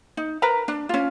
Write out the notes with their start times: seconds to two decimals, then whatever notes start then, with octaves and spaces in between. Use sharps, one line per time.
0.17 D#4
0.42 A#4 B4 A#5
0.68 D4
0.89 C#4 F4